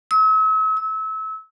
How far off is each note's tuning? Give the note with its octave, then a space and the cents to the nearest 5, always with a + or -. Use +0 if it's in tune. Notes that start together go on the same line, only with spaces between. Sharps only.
E6 -45
E6 -30